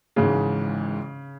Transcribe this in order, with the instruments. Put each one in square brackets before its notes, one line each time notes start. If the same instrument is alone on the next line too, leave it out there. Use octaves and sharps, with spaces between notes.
[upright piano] G#1 G#2 E3 G#3 [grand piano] C#3